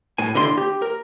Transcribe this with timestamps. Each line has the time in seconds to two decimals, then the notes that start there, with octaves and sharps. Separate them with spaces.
0.18 A2 G#5
0.34 D#2 D3 E4 C6
0.58 G4
0.82 A#4